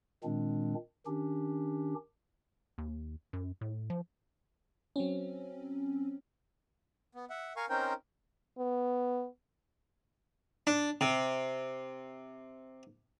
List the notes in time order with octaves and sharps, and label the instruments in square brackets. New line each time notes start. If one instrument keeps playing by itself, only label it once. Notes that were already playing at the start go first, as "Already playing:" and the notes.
[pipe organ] A#2 D#3 G#3 C4 D4
D#3 C#4 D4 G4
[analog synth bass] D#2
F#2
A2
F3
[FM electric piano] F#3 C4 C#4
[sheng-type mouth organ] B3
E5 F#5
A#4 F5 G#5 C#6
C4 C#4 D#4 A#4 C5 G5
[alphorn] B3
[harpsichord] D4
C3